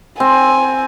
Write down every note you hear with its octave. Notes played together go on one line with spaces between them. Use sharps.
C4 G#5